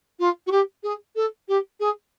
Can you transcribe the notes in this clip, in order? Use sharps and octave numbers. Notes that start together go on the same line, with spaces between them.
F4
F#4
G4
G#4
A4
G4
G#4